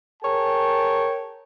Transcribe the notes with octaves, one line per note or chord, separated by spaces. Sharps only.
G#4 A#4 C#5 G5 A5